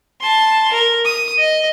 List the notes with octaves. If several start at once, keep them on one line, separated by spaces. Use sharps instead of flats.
A5 C6
A#4
D#6
D#5